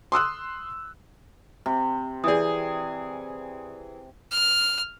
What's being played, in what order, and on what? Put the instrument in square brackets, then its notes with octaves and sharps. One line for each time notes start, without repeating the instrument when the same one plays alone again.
[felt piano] C6 D#6 E6 F#6
[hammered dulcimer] C3
[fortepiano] E3 G#4 [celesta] D5 D#6
[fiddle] F6